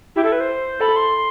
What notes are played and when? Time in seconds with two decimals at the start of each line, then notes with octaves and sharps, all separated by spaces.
0.16 E4 G4
0.24 A4
0.32 B4
0.40 C5
0.80 A4 B5
0.96 C6